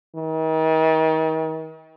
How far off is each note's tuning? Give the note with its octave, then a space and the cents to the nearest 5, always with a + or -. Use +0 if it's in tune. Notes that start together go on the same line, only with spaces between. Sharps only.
D#3 +40